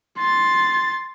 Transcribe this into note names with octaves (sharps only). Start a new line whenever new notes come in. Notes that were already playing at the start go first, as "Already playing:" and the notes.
C6 A6